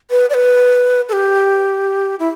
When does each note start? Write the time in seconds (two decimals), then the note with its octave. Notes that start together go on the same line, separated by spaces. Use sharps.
0.10 B4
0.30 D5
0.34 B4
1.09 A4
1.13 G4
2.19 E4